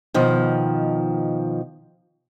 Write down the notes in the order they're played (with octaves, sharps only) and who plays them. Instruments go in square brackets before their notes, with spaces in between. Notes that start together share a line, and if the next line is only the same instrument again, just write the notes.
[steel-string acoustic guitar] B2 D#3 F3